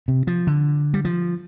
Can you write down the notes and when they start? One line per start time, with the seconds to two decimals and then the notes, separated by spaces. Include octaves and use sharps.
0.08 C3
0.27 F3
0.47 D3
0.94 G3
1.05 F3